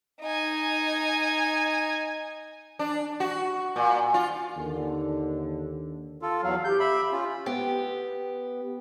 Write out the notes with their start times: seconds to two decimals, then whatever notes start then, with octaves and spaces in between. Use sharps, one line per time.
0.21 D#4 G#5
2.79 D4
3.20 F#4
3.76 A#2
4.14 F4
4.56 D#2 D3
6.22 F4 A4
6.42 E2 F#3 F5
6.64 G4 G6
6.80 E5 B5
7.12 C#4 F4
7.46 B3 G4